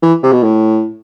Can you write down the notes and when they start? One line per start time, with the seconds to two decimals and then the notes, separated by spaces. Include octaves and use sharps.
0.02 E3
0.23 C3
0.32 B2
0.43 A2